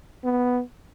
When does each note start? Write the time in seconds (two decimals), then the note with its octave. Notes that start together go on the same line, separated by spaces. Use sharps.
0.24 B3